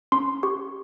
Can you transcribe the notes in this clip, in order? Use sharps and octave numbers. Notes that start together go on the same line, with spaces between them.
C#4 C6
G4 C#6